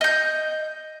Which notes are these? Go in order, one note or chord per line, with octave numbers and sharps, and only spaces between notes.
D#5 G6